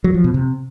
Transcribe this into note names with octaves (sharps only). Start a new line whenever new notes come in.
F#3
F3
B2
C3